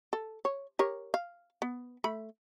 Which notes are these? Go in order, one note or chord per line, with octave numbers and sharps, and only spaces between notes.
A4
C#5
G4 A#4 C#5
F5
B3
A3 B5